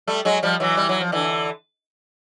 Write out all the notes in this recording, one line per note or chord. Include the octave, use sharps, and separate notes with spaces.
G3 A3
F#3 G#3
F3 G3
E3 F#3
G3
F#3
F3
D3 E3